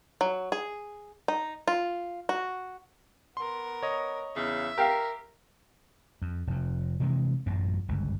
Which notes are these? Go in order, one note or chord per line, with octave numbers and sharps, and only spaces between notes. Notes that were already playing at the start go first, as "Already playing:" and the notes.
F#3
G#4
D#4
F4
F#4
B3 A#4 C6
C#5 D#5
E2 C#3 E5 F5
G4 A#4 F5
F2
F1 F2
C3 E3 G#3
A1 F#2 A#2 F#3
G1 C#2 F#2